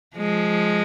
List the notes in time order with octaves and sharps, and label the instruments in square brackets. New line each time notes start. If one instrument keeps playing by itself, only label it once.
[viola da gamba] F3 G#3